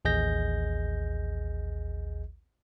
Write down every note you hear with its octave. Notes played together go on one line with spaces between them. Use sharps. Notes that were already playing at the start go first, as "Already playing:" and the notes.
A1 D#2 G#4 D#5 G6 A#6